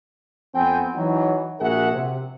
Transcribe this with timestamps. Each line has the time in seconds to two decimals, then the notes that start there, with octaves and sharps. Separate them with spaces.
0.55 F2 B3 C4 G5 G#5
0.96 E3 F#3 D#4
1.60 A#1 F#4 G#4 A#4 E5 F#5
1.93 C3